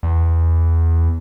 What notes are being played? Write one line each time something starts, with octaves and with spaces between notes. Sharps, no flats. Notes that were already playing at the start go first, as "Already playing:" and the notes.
E2